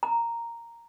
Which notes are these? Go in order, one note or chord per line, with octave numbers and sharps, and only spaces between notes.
A#5